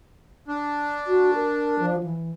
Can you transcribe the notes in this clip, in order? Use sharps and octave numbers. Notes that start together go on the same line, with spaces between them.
D4
F#4
A#4
F3
E3